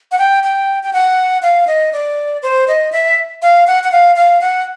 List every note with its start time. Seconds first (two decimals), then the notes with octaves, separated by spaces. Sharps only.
0.12 F#5
0.18 G5
0.44 G5
0.83 G5
0.93 F#5
1.42 F5
1.67 D#5
1.93 D5
2.43 C5
2.68 D#5
2.92 E5
3.42 F5
3.67 F#5
3.84 F#5
3.92 F5
4.16 F5
4.41 F#5